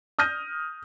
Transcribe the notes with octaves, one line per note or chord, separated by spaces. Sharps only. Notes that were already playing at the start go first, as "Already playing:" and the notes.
D#6 F6 G6 A#6 D#7